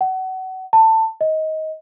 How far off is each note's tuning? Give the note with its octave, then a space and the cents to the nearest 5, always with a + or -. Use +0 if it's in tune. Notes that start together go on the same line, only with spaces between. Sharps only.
F#5 +25
A5 +20
D#5 +20